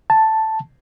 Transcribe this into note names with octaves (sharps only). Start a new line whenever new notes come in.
A5